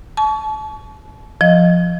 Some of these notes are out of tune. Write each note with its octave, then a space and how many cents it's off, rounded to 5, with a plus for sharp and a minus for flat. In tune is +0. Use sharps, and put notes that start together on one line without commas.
A5 -35 C#6 +35
F3 +0 D#5 +0